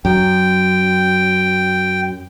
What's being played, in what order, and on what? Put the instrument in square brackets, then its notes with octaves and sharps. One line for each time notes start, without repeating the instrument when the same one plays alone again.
[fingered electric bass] F#2 [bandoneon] G5